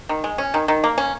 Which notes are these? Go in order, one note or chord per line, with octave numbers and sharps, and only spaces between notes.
D#3
G#3
C#4
D#3
D#3
A#3
C#4